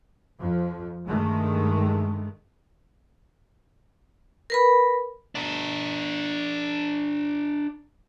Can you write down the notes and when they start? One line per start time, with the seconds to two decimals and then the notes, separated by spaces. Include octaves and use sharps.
0.39 F2 F3
1.07 G2 D#3 G#3 A3
4.50 A#4 B4 B5
5.35 D4 A#4